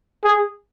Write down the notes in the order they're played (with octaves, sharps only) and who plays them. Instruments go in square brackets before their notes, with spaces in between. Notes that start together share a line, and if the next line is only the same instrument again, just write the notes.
[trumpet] G#4